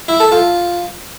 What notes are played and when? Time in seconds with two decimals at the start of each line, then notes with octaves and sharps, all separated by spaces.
0.08 E4
0.20 A4
0.32 F4